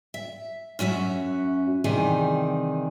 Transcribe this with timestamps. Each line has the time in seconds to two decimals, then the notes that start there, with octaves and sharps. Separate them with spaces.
0.14 E5
0.79 F#2 C#4 F#4 E5
1.84 C3 D#3 E3 G3 G#4